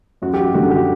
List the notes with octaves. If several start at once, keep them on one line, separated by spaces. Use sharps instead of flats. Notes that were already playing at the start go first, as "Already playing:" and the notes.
F#2 F#4
G4
F#4
D3 G3 F#4
G4